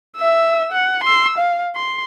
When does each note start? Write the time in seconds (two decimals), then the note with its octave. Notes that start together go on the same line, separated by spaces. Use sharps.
0.17 E5 E6
0.72 F#5
1.04 C6 E6
1.38 F5
1.75 C6